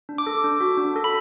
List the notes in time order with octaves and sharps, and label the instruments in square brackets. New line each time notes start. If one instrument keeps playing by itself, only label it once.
[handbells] D4
D6
A4
D4
F#4
D4
A4
B5